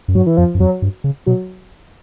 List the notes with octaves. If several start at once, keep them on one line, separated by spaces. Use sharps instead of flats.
F#2
G2 F#3
E3
F2 F3
F#2
F2 F#3
G2
C#3
B2 F#3